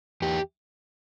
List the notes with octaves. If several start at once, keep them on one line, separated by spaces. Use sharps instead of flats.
E2 G4